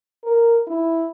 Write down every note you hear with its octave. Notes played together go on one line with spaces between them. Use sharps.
A#4
E4